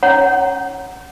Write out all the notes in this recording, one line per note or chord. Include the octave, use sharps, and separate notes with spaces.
C#4 C#5 F#5 A#5